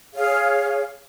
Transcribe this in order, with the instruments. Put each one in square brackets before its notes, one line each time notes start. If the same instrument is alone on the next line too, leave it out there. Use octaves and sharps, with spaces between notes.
[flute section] G#4 C#5 F5